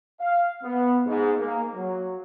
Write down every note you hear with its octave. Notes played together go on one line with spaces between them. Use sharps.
F5
B3
G#2
A#3
F#3